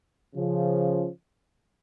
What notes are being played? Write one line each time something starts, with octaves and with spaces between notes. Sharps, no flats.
C#3 F3